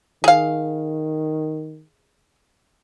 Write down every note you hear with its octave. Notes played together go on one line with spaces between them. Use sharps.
D#3 G#4 F5